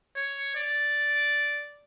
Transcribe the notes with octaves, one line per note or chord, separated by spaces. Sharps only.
C#5
D5